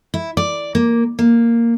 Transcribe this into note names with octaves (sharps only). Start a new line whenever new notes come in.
E4
D5
A#3
A#3